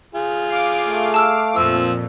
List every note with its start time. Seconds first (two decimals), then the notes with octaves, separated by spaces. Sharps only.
0.15 F4 G#4
0.50 F5 D6 D7
0.84 A3
1.14 A5 E6 F6
1.56 F2 A#2 F3 C4 E6